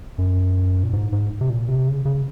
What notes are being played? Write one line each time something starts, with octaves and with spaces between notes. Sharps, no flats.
F#2
A#2
G#2
G#2
C3
A#2
C3
C#3
C#3